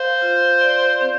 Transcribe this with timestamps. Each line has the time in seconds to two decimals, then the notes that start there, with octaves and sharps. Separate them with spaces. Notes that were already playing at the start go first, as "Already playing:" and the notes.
Already playing: C5 F5
0.22 F4
0.61 D5
1.01 C4